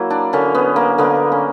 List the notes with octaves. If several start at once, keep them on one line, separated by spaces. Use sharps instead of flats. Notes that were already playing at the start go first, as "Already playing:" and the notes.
Already playing: F#3 A#3 E4
D4
D3 A#3 C#4
B3
A#3
D3 A#3 B3
C#4